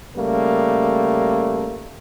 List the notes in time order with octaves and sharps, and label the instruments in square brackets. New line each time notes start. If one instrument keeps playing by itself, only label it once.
[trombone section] C#3 G3 A3 A#3